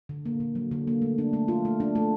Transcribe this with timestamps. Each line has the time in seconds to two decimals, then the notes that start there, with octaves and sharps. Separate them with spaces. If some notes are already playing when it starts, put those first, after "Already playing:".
0.09 D3
0.26 A#3
0.40 D3
0.55 F#3
0.71 D3
0.87 A#3
1.02 A3
1.18 D4
1.33 A3
1.48 F4
1.65 A3
1.80 D4
1.95 A3